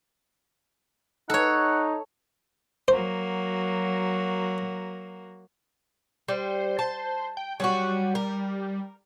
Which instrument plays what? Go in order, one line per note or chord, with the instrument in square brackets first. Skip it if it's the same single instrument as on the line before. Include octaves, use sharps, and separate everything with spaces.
[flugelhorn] D#4 [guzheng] A4 C#5 [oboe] F#5
[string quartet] F#3 A#3 F#4 [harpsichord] C5
[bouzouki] G3 [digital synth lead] C5
[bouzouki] A5
[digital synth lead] G5
[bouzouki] F#3 C#4 F#4 [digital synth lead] G3
[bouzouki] A#4